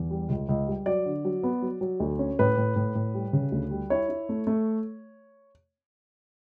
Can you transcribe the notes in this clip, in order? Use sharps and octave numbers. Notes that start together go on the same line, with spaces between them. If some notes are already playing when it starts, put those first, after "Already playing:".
Already playing: E2
G3
C#2
C#2
G3
F#3 D5
D3
F#3
B3
F#3
F#3
D2
C#4
A2 B4
A2
A2
A2
G3
C#3
D2
G3
E4 C#5
E4
A3
A3